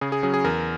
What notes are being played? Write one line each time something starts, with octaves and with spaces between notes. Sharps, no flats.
C#3 G#4
G#4
F#3 C#4 G#4
G#4
E2 A#4